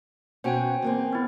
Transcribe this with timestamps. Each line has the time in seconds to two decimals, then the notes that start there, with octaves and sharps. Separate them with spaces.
0.44 B2 C#4 F#4 C5 G5 G#5
0.82 E2 A#3 C4
1.13 B3 E4